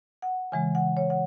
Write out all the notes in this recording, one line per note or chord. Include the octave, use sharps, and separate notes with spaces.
F#5
C#3 E3 G#3 G#5
F#5
C#5
F#5